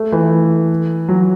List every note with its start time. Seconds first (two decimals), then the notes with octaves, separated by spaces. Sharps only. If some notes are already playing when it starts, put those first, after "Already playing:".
Already playing: A3
0.12 E3
1.08 F#3